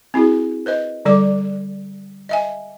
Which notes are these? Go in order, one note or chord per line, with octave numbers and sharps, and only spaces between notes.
C4 E4 F#4 G#4
B4 C5 D#5
D3 G3 A4 D5 D6
D#5 E5 G#5